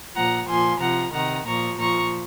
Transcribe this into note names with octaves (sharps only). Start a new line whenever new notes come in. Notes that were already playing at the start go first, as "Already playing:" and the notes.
A#2 F3 F#5 A#5
A#2 F3 G#5 C6
C3 F3 F#5 A#5
C3 D#3 F#5 A#5
A#2 F3 A#5 C#6
A#2 F3 A#5 C#6